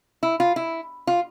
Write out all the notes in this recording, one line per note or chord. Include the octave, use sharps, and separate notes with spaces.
E4
F4
E4
F4